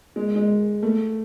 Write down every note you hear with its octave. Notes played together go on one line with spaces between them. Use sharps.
G#3
G#3
A3